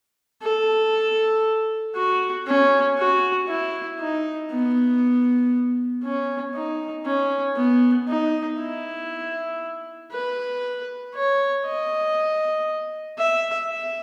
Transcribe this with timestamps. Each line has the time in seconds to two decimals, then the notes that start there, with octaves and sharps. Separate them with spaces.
0.43 A4
1.96 F#4
2.47 C#4
2.98 F#4
3.48 E4
4.00 D#4
4.51 B3
6.04 C#4
6.55 D#4
7.06 C#4
7.57 B3
8.09 D#4
8.60 E4
10.12 B4
11.15 C#5
11.67 D#5
13.19 E5
13.71 E5